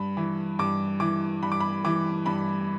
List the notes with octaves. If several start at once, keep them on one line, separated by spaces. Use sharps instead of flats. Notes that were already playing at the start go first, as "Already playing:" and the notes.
Already playing: G2 B5
E3
G2 D6
E3 D6
G2 B5
D6
B5
E3 D6
G2 B5